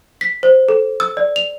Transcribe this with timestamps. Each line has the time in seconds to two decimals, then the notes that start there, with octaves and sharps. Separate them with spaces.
0.21 B6
0.43 C5
0.69 A4
1.00 E6
1.17 D5
1.36 F7